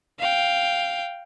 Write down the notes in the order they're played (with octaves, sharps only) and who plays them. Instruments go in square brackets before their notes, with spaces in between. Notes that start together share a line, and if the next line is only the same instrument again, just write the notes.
[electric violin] F5 G5